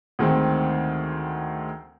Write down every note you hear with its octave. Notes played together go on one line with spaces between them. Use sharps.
D2 D#3 G#3 C4